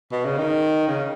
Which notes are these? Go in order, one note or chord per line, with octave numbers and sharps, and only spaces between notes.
B2
C#3
D#3
C#3